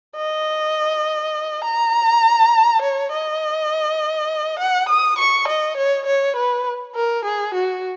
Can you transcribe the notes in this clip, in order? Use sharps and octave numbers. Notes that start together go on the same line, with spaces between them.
D#5
A#5
C#5
D#5
F#5
D#6
C#6
D#5
C#5
C#5
B4
A#4
G#4
F#4